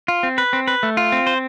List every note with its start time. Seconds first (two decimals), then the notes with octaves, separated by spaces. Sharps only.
0.08 F4
0.23 C4
0.38 B4
0.53 C4
0.68 B4
0.83 A3
0.97 F4
1.12 C4
1.27 C5